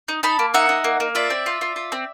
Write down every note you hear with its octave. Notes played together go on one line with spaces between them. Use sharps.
D#4
D#4 A5 B5
A#3
D#4 E5 F#5
D#4
A#3
A#3
F4 D5 E5
C4
F4
F4
F4
C4